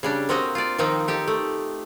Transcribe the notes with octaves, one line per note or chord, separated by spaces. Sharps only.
C#3 G3 D4
A#3 C4 F#4 D#5 A#5
F4 D5
D#3 F3 A#3 C4 D#4
D#4 G4 A4
A3